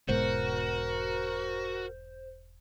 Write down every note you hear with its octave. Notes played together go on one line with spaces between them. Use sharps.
E1 G#2 B2 F#4 A#4 C5